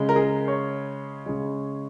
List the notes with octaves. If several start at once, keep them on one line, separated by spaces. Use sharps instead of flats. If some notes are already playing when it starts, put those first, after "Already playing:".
Already playing: C#3 G#3
A#4
G#4
A#4
C#5
C#3 G#3